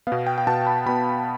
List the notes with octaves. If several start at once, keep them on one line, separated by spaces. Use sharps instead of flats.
B2 B3 F5
G5
G5
B2 B3 A5
B5
B2 B3 B5